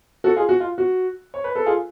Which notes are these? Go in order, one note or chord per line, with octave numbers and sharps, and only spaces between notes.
F#4 A4
F4 G#4
F#4
F4
F#4
C#5
B4
A4
F4 G#4